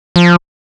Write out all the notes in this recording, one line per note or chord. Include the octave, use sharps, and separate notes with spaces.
F3